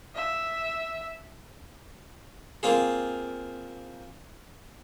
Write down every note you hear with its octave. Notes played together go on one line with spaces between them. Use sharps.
E5
A#3 C4 F4 G#4